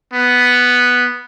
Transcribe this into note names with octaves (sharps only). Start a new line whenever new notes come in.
B3